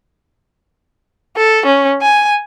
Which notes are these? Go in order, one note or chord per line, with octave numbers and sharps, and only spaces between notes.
A4
C#4
G#5